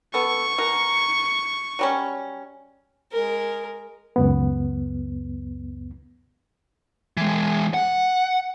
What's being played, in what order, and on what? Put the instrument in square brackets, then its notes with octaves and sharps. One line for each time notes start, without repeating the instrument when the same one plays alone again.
[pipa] B3 A4 [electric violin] C#6
[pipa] B2 A#4
F#3 G3 C#4
[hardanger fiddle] G#3 A#4
[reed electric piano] C#2 F#2 B3
[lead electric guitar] E3 G#3
F#5